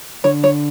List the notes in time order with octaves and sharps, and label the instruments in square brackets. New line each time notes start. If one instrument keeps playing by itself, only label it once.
[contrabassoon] D3 [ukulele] C#5
[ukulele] C#5